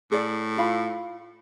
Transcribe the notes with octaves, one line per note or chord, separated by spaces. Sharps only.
A2 G#4 D5
F4 F5 B5